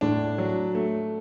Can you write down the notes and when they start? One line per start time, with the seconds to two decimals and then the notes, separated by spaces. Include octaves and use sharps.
0.01 A2 D4
0.38 F#3
0.75 A3